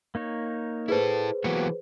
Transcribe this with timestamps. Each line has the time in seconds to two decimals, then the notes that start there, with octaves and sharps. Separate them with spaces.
0.15 A#3 D#4 C#5
0.88 E4 G#4 A4 B4 C5
1.44 E3 F#3 A#3 B3 F#4 G4